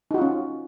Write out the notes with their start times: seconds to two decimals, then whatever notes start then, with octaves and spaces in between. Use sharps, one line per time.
0.11 D#4
0.14 F#4
0.18 F4
0.22 C#4